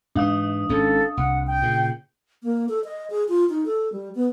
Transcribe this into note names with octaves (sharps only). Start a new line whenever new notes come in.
G#2 E3 D4 F5 D#6
G#1 G#2 C#4 A4
C2 F#5
G5
A#2 C#3
A#3
A4
D#5
G#4
F4
D#4
A4
G3
B3